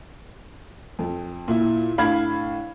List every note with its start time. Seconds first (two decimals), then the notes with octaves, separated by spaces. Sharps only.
0.99 F2
1.48 A#2 E4
1.98 A2 D4 F5 B5 G#6